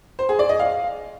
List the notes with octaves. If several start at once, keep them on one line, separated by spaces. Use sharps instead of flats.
C5
G#4
D5
D#5
F5